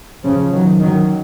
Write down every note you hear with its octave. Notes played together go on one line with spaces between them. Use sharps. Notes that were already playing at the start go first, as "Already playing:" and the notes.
C#3 F3
D#3 F#3
D#3 F#3